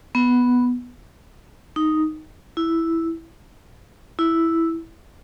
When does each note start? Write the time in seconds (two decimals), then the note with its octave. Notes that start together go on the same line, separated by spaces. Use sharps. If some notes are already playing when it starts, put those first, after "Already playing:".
0.15 B3
1.76 D#4
2.57 E4
4.19 E4